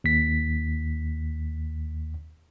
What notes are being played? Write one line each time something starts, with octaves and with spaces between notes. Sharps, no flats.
D#2 B6